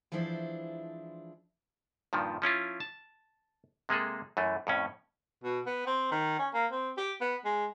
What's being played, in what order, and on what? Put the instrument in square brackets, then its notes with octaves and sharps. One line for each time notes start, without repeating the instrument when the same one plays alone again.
[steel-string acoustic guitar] E3 F3 G#3 D4 E4 C5
[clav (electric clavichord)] G2 A#2 D#3 F3
F3 C#4 E4 F4
A5
C3 G#3 A#3 G#4 A4
F#2 E3 A3
F2 A2 C#4
[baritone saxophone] B2
B3
C4
D#3
C#4
A#3
C4
G4
B3
G#3